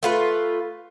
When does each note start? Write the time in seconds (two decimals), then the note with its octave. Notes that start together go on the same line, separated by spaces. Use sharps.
0.03 A3 F4 B4